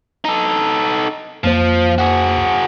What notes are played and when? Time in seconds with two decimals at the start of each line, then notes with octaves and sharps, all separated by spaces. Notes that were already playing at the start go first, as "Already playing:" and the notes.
0.25 D#4 A4
1.44 F2 F3 A#3 C5
1.98 F#4 G#4